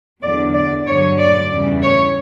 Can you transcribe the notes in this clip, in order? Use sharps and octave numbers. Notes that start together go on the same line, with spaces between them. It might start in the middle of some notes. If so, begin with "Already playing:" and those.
E2 D3 F#3 D5
D5
G2 D3 F#3 C#5
D5
E2 C#3 E3 G3
C#5